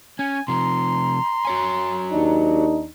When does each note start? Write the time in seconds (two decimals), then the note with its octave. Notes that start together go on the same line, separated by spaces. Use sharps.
0.19 C#4 G#5
0.48 C3 F3 A#5 C6
1.45 F#4 C#5 G#5
2.12 D#2 D4 D#4